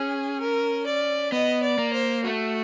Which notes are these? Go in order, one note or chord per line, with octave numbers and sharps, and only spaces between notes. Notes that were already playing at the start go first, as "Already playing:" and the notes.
Already playing: C#4 G#4
A#4
D5
B3 D#5
D5
A#3
C5
A3 F#4